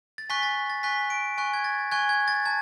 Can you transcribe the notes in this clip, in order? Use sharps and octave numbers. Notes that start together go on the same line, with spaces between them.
A6
G#5 C#6 F#6 B6
A6
A6
G#5 C#6 F#6 B6
D7
G#5 C#6 F#6
G#6
A6
G#5 C#6 F#6 G#6
G#6
A6
A5 G#6